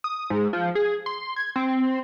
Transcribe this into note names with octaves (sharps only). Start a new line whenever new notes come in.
D#6
G#2
F3
G#4
C6
G#6
C4